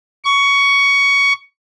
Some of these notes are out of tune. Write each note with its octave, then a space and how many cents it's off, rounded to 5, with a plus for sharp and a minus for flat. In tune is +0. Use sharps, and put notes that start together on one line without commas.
C#6 +15